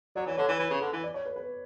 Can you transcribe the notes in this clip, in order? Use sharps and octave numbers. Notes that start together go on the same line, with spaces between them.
F#3 D5
E3 C#5
D3 C#5
E3 C#5
E3 B4
C#3
D3
E3
D5
C#5
B4
B4